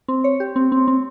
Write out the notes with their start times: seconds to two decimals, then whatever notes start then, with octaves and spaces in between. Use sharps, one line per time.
0.08 C4
0.24 C#5
0.40 G4
0.56 C4
0.72 C4
0.87 C4